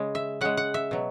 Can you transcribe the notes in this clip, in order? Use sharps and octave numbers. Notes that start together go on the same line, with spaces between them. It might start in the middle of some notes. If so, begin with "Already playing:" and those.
Already playing: C#3 G#3
E5
C#3 G#3 F#5
F#5
E5
B2 F#3